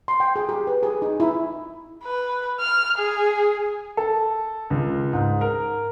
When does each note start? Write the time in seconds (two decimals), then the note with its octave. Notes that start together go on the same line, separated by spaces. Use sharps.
0.08 C6
0.20 G5
0.36 G#4
0.49 G4
0.67 B4
0.83 G#4
1.02 D#4
1.20 E4
2.04 B4
2.60 F6
2.98 G#4
3.97 A4
4.70 C#2
5.13 G#2
5.41 A#4